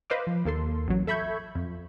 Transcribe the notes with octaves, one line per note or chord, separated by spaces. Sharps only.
B4 C5 D#5 F5 D6
F3
D#2 A#3 A4 C6
A1 F#3
A4 E5 B5 C#6 G6 G#6
F2